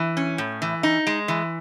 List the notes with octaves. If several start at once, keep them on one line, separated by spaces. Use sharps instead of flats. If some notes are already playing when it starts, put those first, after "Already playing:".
Already playing: E3
C#4
A2
E3
D#4
G#3
E3